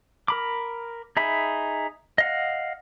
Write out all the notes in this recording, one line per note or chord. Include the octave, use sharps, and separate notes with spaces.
A#4 B5 D6
D#4 G#4 E5 B5
D#5 F5 F#5